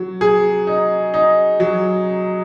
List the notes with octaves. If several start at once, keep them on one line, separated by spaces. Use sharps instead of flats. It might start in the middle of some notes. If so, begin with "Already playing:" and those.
Already playing: F#3
G#4
D#4
D#4
F#3